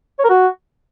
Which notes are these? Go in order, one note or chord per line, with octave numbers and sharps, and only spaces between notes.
C#5
A#4
F#4